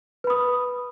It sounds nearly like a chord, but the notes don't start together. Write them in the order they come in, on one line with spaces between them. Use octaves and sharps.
B4 B5 D#6